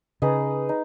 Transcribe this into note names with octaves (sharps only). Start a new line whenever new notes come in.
C#3 D#4 G#4 B4 D#5
D#4